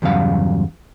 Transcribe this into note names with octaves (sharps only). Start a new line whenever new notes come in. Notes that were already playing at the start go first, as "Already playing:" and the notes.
E2 G2 C#3 F#3 F5